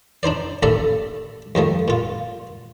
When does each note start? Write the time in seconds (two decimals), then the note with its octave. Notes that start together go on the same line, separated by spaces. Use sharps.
0.23 D4 D#4 C5 D5
0.63 A1 D#2 A4 D5 E5
1.55 D#2 D#3 F3 A3
1.88 A#2 F4